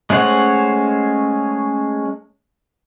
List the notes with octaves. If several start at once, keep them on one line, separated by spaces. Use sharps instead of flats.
G#3 A3 C#4 C5 F#5